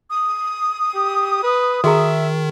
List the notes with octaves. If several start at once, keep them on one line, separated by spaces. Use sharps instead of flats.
D#6
G4
B4
D#3 F#4 G#4 E5 A#5